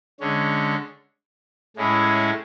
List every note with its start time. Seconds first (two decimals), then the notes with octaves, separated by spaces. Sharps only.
0.20 D3 G#3 C#4
1.76 A2 G#3 C#4 E4 G#4